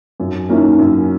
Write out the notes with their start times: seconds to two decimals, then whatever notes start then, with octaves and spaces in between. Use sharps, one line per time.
0.20 F#2
0.49 D#3 A#3 C#4 E4
0.79 F#2